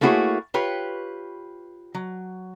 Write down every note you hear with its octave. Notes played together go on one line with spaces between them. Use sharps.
A3 A#3 E4 F#4 G#4 C#5
F4 G4 B4 C#5
F#3